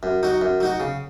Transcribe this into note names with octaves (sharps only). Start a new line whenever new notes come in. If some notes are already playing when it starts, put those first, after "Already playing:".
F#2
F#3 D#4 F#4
F#2
F#3 D#4 F#4
C#3